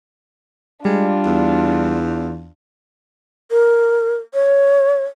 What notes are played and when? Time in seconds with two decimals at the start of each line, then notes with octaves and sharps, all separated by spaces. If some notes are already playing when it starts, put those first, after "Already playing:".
0.85 G3 G#3 D4 F4
1.26 E2
3.51 A#4
4.34 C#5